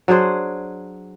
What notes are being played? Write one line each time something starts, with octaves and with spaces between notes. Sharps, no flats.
F#3 D4 G#4 C5